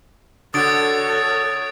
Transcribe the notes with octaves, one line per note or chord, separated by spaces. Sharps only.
D3 F#4 A4 C#5 D#6 A6 D7